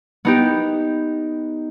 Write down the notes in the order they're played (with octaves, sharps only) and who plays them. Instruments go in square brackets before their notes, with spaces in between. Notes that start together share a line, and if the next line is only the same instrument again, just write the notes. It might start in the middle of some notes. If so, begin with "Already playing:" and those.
[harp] B3 D#4 G4